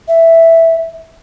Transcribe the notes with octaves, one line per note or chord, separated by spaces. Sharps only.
E5